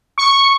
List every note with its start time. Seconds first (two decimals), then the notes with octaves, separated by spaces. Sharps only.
0.18 C#6